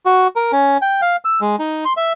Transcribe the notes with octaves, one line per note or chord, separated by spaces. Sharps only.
F#4
A#4
C#4
G5
F5
E6
G#3
D#4
C6
E5